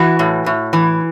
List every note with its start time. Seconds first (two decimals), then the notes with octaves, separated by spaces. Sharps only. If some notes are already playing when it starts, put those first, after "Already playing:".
Already playing: E3 F#4
0.19 A2
0.46 A2
0.73 E3